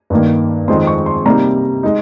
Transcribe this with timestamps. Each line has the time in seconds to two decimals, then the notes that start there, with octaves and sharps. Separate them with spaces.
0.10 G2 D#3 A#3
0.68 F2 D#3 G#3 C4 C6
0.87 C#6
1.06 C6
1.26 C3 G3 A#3 D#4 A#5
1.83 G#3 D#4